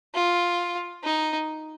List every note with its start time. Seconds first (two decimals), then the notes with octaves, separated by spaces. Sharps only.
0.14 F4
1.04 D#4